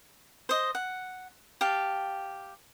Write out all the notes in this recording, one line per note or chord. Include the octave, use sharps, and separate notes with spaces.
C5 D#5
F#5
G4 F5 A5